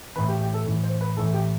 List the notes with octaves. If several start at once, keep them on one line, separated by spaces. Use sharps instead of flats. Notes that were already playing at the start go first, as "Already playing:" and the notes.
A2 E3 B4
G4
G4
A4
A2 E3
C5
B4
A2 E3 A4
G4